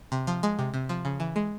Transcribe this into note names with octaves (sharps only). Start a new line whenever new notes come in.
C3
F3
G#3
C3
C3
F3
C#3
E3
G#3